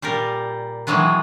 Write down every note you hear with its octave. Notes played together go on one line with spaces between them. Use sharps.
A#2 G3 G4 A#4
B2 D#3 E3 F#3 G#3 B3